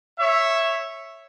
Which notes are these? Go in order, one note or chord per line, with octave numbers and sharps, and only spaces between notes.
C#5 E5